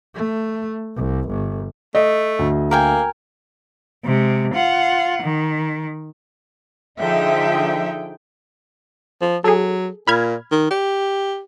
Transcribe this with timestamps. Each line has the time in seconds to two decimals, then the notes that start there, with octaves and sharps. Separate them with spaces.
0.15 A3
0.96 C2
1.29 G1
1.95 A3 D#5
2.39 D2
2.71 A#3 A#4 G5 G#5
4.05 C3 G#3
4.55 F4 F#5
5.23 D#3
6.99 D3 F3 D#4 G#4 E5 G5
9.22 F3
9.44 F#3 G#4 A4
10.08 A#2 B5 F6 G#6
10.52 D#3
10.71 G4